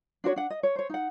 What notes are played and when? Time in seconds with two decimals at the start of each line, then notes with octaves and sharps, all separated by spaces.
0.24 D4 F#4 C5 C#5
0.36 D4 F#5
0.50 D#5
0.63 C#5
0.76 C5 C#5
0.90 D#4 F#5